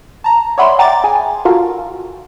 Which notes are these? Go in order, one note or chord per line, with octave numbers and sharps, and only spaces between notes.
A5 A#5
C#5 D5 E5 F#5 B5 C6
E5 F#5 G5 A#5 D6 A6
G#4 G#5
F4 F#4 A4 A#4 F5